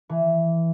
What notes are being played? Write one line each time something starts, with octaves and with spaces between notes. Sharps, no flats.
E3